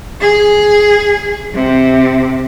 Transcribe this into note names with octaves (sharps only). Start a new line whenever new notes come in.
G#4
C3